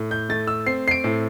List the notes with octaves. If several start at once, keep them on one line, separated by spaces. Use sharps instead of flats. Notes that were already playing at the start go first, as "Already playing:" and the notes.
Already playing: A2
G6
A3 A6
E6
C4 C7
C7
D7
A2